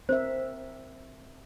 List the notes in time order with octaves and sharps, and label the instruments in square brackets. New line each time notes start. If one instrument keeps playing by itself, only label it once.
[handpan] C4 A#4 E5 [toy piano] C5